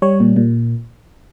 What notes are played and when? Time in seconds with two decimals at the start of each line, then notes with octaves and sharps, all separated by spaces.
0.02 G3 C#5
0.20 A#2
0.36 A#2